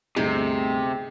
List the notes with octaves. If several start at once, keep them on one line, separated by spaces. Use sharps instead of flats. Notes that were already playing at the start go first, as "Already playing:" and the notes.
G1 D2 C3 D#4 G#4